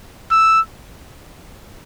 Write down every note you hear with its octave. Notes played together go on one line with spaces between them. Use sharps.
E6